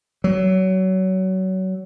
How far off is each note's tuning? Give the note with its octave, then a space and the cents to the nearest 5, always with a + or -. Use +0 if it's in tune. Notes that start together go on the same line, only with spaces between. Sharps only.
F#3 +25